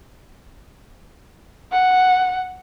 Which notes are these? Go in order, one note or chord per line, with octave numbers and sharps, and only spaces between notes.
F#5